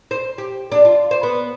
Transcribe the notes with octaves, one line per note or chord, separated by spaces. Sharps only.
C5
G4
D4
F4
C5
B3